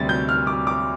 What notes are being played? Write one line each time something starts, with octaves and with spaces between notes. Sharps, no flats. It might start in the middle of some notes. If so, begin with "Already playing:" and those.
Already playing: D2 C3 G3 A6
G6
F6
D6
D6